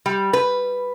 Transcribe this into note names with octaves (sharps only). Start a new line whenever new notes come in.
G3
B4